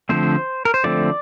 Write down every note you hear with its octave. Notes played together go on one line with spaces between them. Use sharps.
D3 F3 A3 C4 C5
A#4
C5
D3 F3 A3 C4 D5